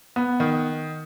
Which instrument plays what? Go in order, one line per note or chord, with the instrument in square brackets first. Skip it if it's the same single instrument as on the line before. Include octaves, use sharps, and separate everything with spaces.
[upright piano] B3
D#3